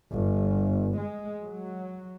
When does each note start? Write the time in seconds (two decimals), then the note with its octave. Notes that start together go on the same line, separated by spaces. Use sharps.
0.11 G1
0.97 G#3
1.43 F#3